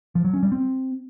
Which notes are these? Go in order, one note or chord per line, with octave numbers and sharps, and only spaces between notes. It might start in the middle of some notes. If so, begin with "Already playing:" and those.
F3
F#3
C#4
G3
C4